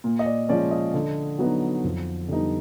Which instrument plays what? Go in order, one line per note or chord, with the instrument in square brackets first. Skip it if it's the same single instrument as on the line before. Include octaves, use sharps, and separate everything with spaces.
[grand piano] A#2
D#5
D5
F3 G#3 C#4 D5
D#5
D3
F#3 B3 D#4
F2
D3 G3 B3 D#4